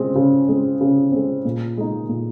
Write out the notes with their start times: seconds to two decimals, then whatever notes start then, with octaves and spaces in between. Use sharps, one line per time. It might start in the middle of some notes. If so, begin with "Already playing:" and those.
Already playing: C#3 G#3 C4
0.15 C#3
0.48 G#3 C4
0.81 C#3
1.12 G#3 C4
1.45 A#2
1.77 G#3 D#4
2.09 A#2